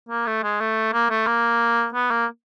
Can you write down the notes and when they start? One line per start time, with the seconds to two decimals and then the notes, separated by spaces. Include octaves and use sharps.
0.09 A#3
0.27 A3
0.43 G#3
0.61 A3
0.93 A#3
1.10 A3
1.27 A#3
1.94 B3
2.11 A#3